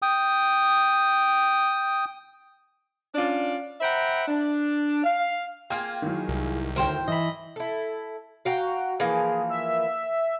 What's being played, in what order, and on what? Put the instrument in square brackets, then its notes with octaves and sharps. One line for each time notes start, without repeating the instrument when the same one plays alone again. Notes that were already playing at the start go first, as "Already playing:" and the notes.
[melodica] G5 D#6
[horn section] C#4 D4 F4 D5
C5 E5 F#5 G5 A#5 B5
D4
F5
[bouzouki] A#3 F4 G#4 [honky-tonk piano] G5 F6
[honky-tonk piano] D#3 E3 F#3
[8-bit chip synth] C2
[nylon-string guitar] D2 C#5 [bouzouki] A#4 C5 G5
[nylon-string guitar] E3 [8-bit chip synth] D#5 B5
[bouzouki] E4 A4
[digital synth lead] F#4 [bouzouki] F5 G5 A#5
[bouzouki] E3 F3 A#3 [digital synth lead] G#4
[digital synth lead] E5